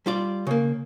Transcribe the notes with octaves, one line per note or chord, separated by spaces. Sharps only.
G3 F4 D5
C#3 A#3